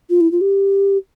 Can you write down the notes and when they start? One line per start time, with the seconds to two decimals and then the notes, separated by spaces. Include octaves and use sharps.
0.10 F4
0.21 E4
0.32 F4
0.41 G4